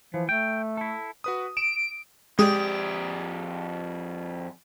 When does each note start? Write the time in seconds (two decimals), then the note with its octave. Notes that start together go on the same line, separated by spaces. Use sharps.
0.14 E3 F3
0.29 A3 G5
0.77 E4 A4
1.24 F#4 B4 D#6
1.57 D7 E7
2.39 F2 G#3 G4 G#4 D5